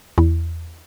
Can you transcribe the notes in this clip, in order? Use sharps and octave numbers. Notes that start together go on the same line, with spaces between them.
E2